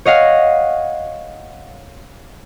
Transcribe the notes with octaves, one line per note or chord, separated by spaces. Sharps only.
C#5 D#5 F5 F#5